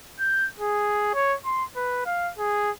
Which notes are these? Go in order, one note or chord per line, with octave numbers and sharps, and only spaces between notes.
G6
G#4
C#5
C6
B4
F5
G#4